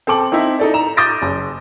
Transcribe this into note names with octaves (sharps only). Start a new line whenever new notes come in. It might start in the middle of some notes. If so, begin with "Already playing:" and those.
C4 A4 A5 D6 F#7
C4 D#4 E4 E5
D#4 A4 D5
A#5 E7
D6 D#6 G6 A6 A#6 D7
F#1